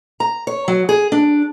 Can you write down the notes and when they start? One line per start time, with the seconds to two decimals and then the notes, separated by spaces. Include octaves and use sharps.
0.20 A#5
0.47 C#5
0.68 F#3
0.89 G#4
1.12 D4